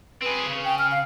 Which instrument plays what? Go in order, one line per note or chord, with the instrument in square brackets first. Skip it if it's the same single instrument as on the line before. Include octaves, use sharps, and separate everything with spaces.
[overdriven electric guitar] C4 G#4 [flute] B4
[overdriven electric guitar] C#3
[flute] G5
F6
F5